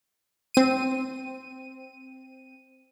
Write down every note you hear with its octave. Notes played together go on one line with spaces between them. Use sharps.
C4 D#7